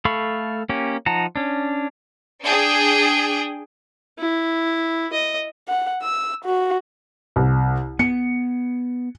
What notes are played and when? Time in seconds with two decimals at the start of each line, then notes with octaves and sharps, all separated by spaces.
0.05 A3 A4 F5 B5 C#6
0.69 A#3 C#4 G4
1.06 F3 D#4 F#5 A5 A#5
1.36 C#4 D4
2.45 D4 G#4 G5
4.19 E4
5.13 D#5
5.68 F#5
6.02 E6
6.45 F#4
7.36 C2
7.99 B3 C#7